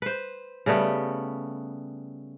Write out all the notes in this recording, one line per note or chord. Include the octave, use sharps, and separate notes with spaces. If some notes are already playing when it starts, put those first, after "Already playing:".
B4 C5
C#3 G3 A3 B3